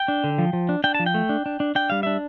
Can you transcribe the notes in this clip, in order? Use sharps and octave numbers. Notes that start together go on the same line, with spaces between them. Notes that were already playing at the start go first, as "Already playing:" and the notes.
Already playing: G5
D4
D3
F3
F3
D4
D4 G5
F3 A5
G5
A3
D4
D4
D4
D4 G5
G3 F5
D4 E5